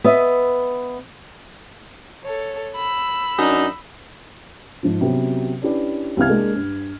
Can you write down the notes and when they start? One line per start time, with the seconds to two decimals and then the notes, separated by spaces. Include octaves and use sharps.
0.04 B3 D#5 E5
2.24 A4 C#5
2.75 B5 E6
3.38 F#2 D4 D#4
4.83 G#2 F3
5.01 C3 F#3 B3 C#4 G4
5.62 C#4 D4 E4 G4 B4 D5
6.17 C2 C3 B3 F5 F6 G#6
6.30 G#3 A#3 D4
6.56 G2